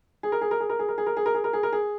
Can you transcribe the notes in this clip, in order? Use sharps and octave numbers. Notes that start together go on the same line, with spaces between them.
G#4
A#4
G#4
A#4
G#4
A#4
G#4
A#4
G#4
A#4
G#4
A#4
G#4
A#4
G#4
A#4
G#4